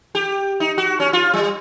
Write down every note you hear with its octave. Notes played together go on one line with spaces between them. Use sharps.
G4
D#4
F#4
C#4
F4
G3